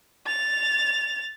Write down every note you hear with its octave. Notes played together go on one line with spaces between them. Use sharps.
A6 F7